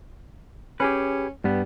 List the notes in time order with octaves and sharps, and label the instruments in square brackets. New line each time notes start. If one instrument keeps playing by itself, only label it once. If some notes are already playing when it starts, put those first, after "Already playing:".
[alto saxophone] C#4 [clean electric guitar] G4 G#4 B4
[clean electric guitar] G2 B3 [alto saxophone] G3